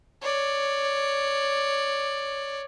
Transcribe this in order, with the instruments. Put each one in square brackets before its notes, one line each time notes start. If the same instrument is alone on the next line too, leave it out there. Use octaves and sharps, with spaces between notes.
[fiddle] C#5 D5